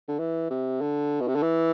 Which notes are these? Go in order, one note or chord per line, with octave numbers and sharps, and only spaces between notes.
D3
E3
C3
D3
B2
C3
D3
E3